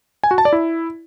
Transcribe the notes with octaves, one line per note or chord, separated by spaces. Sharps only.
G#5
F#4
A5
D5
E4